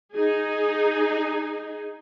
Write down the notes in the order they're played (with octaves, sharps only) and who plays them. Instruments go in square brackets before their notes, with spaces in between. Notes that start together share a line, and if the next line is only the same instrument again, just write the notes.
[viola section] D#4 G#4